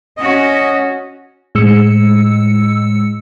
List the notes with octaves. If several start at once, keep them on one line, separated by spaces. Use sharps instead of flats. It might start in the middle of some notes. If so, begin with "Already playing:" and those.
C#4 F#4 D#5
A2 G#3 E6 C#7